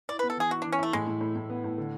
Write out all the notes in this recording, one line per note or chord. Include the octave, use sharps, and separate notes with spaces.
E4 D5
B3 B4
A4
E3 G#4
E4 F#4
E3 D4
C#4
A3 E4
A2 G#3
A2
A2
A2
B3
A2
D3